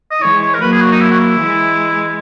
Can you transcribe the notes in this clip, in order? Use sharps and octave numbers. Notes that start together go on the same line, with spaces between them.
D#5
E3 G#3 C#5
C#5
A#4
F#3 A#3 B4
G#4
F#4
D#4
E4
F#4
E4
E3 G#3